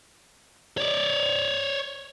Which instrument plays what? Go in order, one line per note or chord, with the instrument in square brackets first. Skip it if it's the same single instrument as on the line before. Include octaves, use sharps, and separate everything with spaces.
[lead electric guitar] C#5 D5